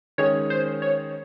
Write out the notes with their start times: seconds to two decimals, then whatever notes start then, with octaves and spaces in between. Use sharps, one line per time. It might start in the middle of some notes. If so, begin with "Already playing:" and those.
0.18 D#3 G#3 C#4 G#4 C#5
0.50 C5
0.82 C#5